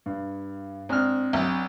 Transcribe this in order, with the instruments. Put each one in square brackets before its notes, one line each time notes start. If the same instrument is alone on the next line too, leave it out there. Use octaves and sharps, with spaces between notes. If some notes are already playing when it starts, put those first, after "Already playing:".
[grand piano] G2
[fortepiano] G#2 F6 [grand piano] C4 D4
[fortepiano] B1